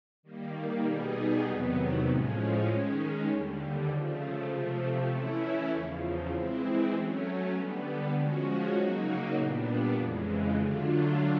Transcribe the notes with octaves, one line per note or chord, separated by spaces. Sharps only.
D#3 G3 A#3
B2 G3 B3 D#4 G#4
E2 C3 D#3 F#3 B3
A2 F3 G#3 C#4
D#3 G#3 C#4
D#2 D3 G3
C#3 F3 A3
C3 F3 A3
E3 A3 C#4 E4
E2 C#3 F3
E3 G#3 C4 E4
F#3 A3 C#4
D3 G3 B3
F3 G#3 C#4 F#4
C#3 F#3 A#3 D#4 F#4
A#2 G3 B3 D4
F2 C#3 E3 G#3
D3 F#3 A3 D4 F4